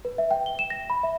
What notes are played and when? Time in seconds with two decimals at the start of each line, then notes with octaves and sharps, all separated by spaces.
0.05 B4
0.18 E5
0.31 G5
0.46 G7
0.59 E7
0.70 A#6
0.90 B5
1.03 E5